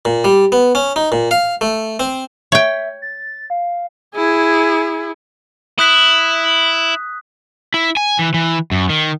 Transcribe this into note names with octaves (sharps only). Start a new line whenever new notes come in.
A#2
G3
B3
C#4
D#4
A#2
F5
A3
C4
C#5 E5 G5
A6
F5
E4 G#4
E4 D#6 F#6 B6
E4
G#5
E3
E3
F#2
D#3